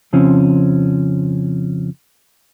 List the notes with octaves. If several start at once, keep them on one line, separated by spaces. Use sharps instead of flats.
F2 C#3 F3 C4 C#4